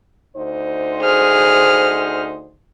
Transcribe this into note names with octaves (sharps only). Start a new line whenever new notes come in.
D2 D#4 C5
G#4 F6